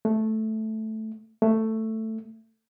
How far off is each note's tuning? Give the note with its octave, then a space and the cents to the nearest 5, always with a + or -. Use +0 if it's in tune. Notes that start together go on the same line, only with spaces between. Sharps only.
A3 -5
A3 +10